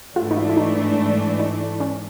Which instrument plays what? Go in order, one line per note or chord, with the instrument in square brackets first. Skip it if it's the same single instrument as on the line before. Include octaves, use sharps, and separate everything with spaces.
[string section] G#2 E3 A3 D4 [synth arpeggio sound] F4
[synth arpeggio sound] D#4
E4
E4
D#4
D#4
C#4